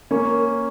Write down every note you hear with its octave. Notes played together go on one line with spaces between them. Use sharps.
A#3 C#4